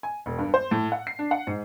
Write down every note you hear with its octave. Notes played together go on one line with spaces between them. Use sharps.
G#5
E1
G2
C5
A2
F#5
C7
D4
F#5
G#2